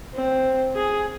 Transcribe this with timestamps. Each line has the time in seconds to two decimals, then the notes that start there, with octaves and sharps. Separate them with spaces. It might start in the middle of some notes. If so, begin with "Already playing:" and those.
0.15 C4
0.76 G#4